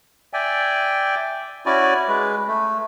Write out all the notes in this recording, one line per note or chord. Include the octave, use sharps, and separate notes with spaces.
D5 E5 G5 G#5
C#4 E4 F#4 D5 G#5
G#3 B4
A3